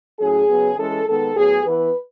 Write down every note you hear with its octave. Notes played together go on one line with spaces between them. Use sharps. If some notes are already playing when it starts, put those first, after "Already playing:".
A2 F#3 C#4 G#4
C#3 F#3 B3
E3 G#3 C#4 A4
D#3 G#3 B3 A4
A2 F#3 B3 G#4
E3 B3 B4